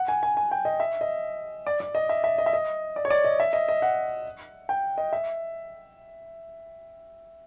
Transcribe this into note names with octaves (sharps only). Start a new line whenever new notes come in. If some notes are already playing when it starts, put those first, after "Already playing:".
Already playing: F#5
G#5
G#5
G#5
G5
D#5
E5
D#5
D5
D5
D#5
E5
E5
D#5
E5
D#5
D5
C#5
D5
D#5
E5
D#5
D#5
F#5
G5
D#5
E5